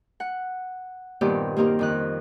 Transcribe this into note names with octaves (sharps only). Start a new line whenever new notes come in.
F#5
G2 A#2 D#3 B3 C4 G4
A#3 C4 D#4 G4 A#4
F2 D#3 F#6